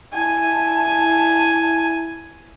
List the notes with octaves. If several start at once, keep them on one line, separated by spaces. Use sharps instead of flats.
E4 G#5 A5